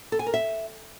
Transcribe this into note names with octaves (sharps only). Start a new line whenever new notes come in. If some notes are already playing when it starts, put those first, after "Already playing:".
A4
G#5
A#4
E5